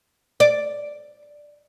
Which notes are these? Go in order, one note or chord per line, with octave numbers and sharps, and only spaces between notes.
D5